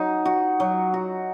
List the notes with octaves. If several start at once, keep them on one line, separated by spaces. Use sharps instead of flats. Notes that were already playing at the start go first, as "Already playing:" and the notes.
Already playing: F#3 D#4 F#4
F#4
F#3
F#4